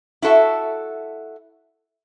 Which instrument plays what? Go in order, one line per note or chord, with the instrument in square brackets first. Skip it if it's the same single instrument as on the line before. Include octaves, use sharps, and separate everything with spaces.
[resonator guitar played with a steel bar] E4 F#4 A4 E5